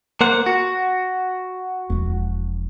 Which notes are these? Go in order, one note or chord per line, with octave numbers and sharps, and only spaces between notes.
A#3 C5 F#5
F#4
E1 F3